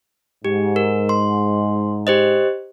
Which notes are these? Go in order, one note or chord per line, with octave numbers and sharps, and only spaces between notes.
G#2 G4
A#4
C6
G4 C5 D#5